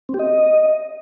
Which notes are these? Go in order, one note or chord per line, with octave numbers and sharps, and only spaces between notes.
C4
G4
D#5